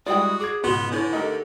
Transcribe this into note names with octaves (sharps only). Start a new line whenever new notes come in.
G3 G#3 E4 F#4 D5 G5 D#6
G#4 D6 G#6
C#2 G#2 B2 B3 F#4 C6
D3 E4 B4 C#5 G#5
A3 D#4 G4 A4 A#4